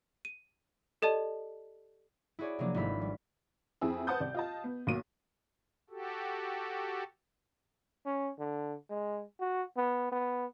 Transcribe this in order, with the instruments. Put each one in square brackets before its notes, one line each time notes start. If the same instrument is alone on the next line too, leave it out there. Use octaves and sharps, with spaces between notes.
[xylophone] D#7
G4 A4 D5 D#5 A5
[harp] E4 F#4 G#4 C#5 D5
C3 F3 F#3 A#3 C#4 D4
G#1 A3 E4 F5 B5 E6
G3
[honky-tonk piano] F2 E4 G#4 E6
B4 C5 F#5 A5 D#6 G6
C2 D5
F4 D#5 A5
B3
B1 A#3 F#4 D#7
[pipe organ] F#4 G4 A4
[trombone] C#4
D3
G#3
F#4
B3
B3